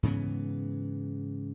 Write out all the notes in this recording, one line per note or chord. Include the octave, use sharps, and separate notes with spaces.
G#2 C#3 E3 B3